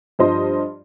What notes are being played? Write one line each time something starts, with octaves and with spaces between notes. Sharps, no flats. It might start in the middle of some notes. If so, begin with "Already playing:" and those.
G2 F3 C5 D#5 C6